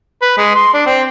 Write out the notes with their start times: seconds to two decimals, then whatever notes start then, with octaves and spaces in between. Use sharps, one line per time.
0.22 B4
0.37 G#3
0.56 C6
0.74 D4
0.86 C4